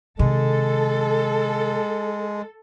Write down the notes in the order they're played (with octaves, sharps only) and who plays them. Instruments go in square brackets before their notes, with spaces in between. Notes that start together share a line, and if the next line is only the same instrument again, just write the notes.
[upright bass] C3 D#3 [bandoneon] G#3 [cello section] A4